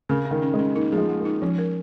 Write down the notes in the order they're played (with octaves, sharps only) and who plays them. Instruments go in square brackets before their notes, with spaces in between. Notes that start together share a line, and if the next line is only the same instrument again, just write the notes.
[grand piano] C#3 [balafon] A#4
[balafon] C#4
[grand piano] D#3
[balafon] C#4
[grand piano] G#3
[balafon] C#4
[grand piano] A#3 [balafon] D#4
[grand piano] F3 [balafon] G#4
[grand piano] G#3
[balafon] G#3
[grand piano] A#3
[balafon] D#4
[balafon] F3 [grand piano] C#4
[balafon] A#4